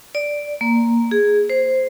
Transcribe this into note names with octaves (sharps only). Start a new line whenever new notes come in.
D5
A#3
G#4
C5